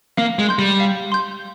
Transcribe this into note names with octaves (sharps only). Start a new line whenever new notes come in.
A#3 F5
G#3
C6 G6
G3
F5
C6 G6